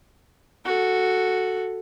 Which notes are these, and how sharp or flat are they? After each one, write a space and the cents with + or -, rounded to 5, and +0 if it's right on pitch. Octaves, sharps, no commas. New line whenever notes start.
F#4 +0 A4 +0